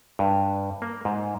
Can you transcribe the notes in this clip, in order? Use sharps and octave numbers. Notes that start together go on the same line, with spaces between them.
G2
A#3
G#2